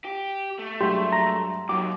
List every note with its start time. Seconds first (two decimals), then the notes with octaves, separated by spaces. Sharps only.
0.04 G4
0.59 A3
0.81 G2 F#3 G#3 G4 C6
1.12 A#5
1.69 D#2 F#3 D6